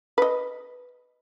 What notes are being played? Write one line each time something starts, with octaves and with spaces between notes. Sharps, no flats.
B4 D#5